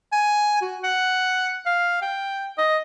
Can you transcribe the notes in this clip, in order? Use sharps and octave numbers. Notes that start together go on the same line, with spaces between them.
G#5
F#4
F#5
F5
G5
D#5